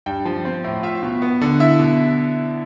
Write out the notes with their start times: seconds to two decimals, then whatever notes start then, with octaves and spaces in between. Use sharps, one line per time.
0.06 G2 G5
0.25 F3
0.45 C4
0.64 A2
0.83 F4 E5
1.03 B2
1.22 B3
1.41 D3
1.60 E4 E5
1.79 B2